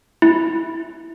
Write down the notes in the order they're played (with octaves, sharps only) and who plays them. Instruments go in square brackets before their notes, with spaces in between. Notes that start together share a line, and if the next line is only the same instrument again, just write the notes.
[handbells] E4